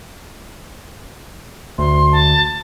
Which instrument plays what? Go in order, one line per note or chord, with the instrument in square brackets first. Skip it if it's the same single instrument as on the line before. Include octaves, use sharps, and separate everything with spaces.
[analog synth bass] D2 [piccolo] C6
[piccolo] A5